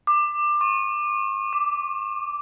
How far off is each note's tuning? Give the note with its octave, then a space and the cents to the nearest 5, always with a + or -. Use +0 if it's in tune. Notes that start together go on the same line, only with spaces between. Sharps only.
D6 +20
C#6 -40
D6 -5